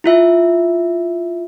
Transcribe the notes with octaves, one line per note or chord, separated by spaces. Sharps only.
E4 F4 E5